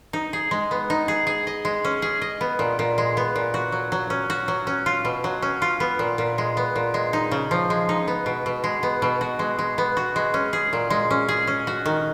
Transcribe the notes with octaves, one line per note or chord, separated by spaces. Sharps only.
D#4
G#4
G#3
B3
D#4
G#4
G#4
D#5
G#3
C#4
G#4
D#5
B3
A#2
A#2
G#3
B3
A#2
F#4
F#3
F#3
C#4
F#4
F#3
C#4
F4
B2
F#3
C#4
F4
B3
A#2
A#2
G#3
B3
A#2
G#3
D#4
C#3
F3
G#3
D#4
B3
B2
B2
G#3
B3
B2
F#4
G#3
G#3
B3
F#4
G#3
C#4
G#4
A#2
G#3
C#4
G#4
C#4
F#4
D#3